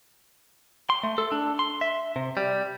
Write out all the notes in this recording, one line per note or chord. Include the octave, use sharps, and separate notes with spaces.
C6
A3
A4
D4
C6
E5
C3
G3